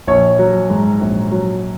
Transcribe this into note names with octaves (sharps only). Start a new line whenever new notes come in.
A#1 C#5
F#3
G#2
A#1
F#3